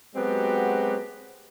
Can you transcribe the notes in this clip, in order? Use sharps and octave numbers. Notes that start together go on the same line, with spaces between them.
F#3 G#3 B3 C4 F#4 G4